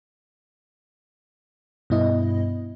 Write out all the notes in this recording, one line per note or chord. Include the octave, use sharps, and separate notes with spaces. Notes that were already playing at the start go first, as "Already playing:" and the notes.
G2 B2 B3 E4 D#5